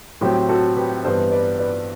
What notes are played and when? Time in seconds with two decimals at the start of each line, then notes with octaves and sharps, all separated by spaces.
0.21 A2 F#3 C4 G4
0.49 F#4 A4
0.76 G4 B4
1.04 G2 E3 B3 A4 C5
1.32 B4 D5
1.59 B4 D5